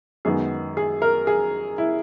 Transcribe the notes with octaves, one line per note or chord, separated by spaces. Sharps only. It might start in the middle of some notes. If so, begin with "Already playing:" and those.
F#2 D#3 G#3 B3 G#4
G#4
A#4
G#4
E4